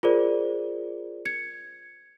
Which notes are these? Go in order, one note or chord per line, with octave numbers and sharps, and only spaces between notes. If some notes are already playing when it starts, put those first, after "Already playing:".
F4 G#4 A#4 C5 D5
G#6 C#7